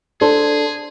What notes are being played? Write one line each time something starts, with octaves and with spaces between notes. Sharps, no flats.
D4 G#4 A4 C5